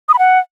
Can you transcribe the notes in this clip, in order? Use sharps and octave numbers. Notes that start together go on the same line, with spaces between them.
D#6
B5
F#5